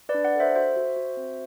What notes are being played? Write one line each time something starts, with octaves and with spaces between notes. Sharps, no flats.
B4 D5
D4
D5 F#5
A4 C5 E5
F#4 C5 E5
F#4
F#4
C4